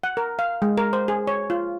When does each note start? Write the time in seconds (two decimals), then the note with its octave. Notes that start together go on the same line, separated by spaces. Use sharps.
0.04 F#5
0.17 A#4
0.39 F5
0.62 G#3
0.78 A#4
0.93 C5
1.08 G#4
1.27 C#5
1.50 F4